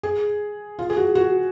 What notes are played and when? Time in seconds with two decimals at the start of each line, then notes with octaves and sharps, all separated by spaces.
0.03 G#4
0.79 F4
0.90 G#4
0.97 F#4
1.15 F#4